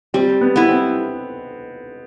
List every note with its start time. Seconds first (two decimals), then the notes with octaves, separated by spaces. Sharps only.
0.14 G3 C4
0.41 B3
0.56 B3 E4
0.69 C4